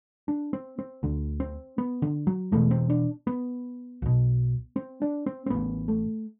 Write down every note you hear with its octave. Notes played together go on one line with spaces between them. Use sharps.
D4
C4
C4
D2 D3
C4
B3
D3
F#3
E1 E2 B2 A3
C4
D4
B3
B1 B2
C4
D4
C4
C4
A1 A2 B3
A3